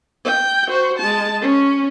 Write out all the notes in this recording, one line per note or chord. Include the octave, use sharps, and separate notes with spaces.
G5
F#4 C5
G#3 A5
C#4